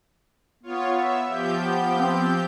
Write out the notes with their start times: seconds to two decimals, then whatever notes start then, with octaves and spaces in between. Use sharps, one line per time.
0.63 B3 F4 C#5
0.95 E5
1.27 F3 G4 G6
1.57 B3
1.98 C4